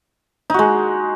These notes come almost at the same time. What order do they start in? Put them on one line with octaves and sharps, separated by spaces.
D#4 F#4 G#3